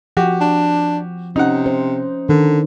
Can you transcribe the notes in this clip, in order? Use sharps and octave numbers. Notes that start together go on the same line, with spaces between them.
F3 F#4 G4
D4
C3 C#4 D#4 F#5
C5
D3 D#3 D4 A#4